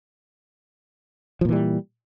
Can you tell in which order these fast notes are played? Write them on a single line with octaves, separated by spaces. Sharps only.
F3 A#2 E3 G3